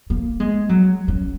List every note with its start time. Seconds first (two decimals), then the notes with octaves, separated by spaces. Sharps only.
0.10 A#3
0.40 G#3
0.69 F#3
1.08 C#4